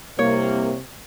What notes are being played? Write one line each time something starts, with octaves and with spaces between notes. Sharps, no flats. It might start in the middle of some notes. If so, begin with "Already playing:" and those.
C2 C3 A#3 C#5